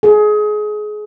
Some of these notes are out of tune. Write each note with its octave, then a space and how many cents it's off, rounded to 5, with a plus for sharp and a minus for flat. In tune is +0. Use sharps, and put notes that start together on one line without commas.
G#4 +25